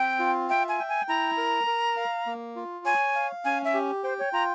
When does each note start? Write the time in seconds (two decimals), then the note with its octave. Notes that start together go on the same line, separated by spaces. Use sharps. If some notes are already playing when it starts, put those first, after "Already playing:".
Already playing: C4 G5
0.19 F4
0.49 E5 G5
0.69 G#5
0.79 G5
0.89 G#5
1.09 E4 A#5
1.37 A#4
1.67 A#4
1.96 F5
2.26 A#3
2.56 F4
2.85 C#5 G#5
3.15 F5
3.45 C#4 G#5
3.65 E5
3.74 G4
4.03 C5 G5
4.19 C#5
4.33 F4 A#5